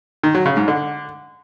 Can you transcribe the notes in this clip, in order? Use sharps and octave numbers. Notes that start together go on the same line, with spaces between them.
D#3
F#3
C#3
G#2
D3